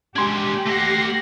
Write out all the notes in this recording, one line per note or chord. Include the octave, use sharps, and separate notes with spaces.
G#3 D4 G4 G#5 C6 G#6
A3 F#5 A#6 C7